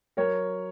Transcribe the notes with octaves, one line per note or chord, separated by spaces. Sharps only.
F#3 A#4 C#5